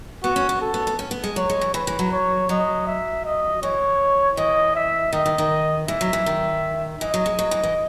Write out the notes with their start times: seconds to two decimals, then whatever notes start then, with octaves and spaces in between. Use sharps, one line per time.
0.24 B3 F#4
0.36 C#4
0.49 B3
0.61 A4
0.74 B3
0.87 B3
0.99 C#4
1.11 B3
1.24 G#3
1.36 F#3 C#5
1.50 G#3
1.61 E3
1.74 E3 B4
1.87 E3
1.99 F#3
2.12 C#5
2.49 F#3 D#5
2.87 E5
3.25 D#5
3.62 E3 C#5
4.37 E3 D#5
4.75 E5
5.12 D#3 D#5
5.26 D#3
5.38 D#3
5.88 E3 E5
6.01 F#3
6.13 E3
6.26 D#3
7.01 E3 D#5
7.14 F#3
7.26 G#3
7.39 F#3
7.51 E3
7.63 E3